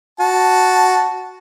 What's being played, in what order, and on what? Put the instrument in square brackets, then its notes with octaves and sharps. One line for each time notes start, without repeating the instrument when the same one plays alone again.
[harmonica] F#4 A5